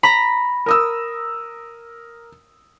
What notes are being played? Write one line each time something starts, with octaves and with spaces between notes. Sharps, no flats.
A#5 B5
A#4 D#6 E6